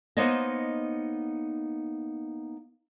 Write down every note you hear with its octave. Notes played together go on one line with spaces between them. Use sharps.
A#3 B3 D#4 C5 C#5 D#5